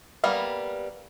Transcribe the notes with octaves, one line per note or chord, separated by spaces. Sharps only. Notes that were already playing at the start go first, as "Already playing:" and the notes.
G3 A#3 B3 F5